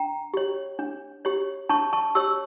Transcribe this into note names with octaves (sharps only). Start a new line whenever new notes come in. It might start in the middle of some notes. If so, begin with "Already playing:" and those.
Already playing: D4 G5 A#5
G4 C#5
D4
G4 C#5
D4 A5 C#6
A5 C#6
G4 C#5 C#6 E6